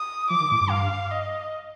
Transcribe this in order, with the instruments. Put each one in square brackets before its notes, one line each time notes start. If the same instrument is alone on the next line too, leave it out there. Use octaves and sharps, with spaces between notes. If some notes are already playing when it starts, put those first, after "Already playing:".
Already playing: [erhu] D#6
[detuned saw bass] F3 [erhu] D6
[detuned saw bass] D#3
A2
G2
[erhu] F5
D#5